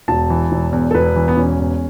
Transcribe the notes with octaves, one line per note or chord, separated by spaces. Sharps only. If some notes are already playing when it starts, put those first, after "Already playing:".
E1 A5
E3
E1
E2
A4
E1 B4
E3
B3
E1 C#4
E2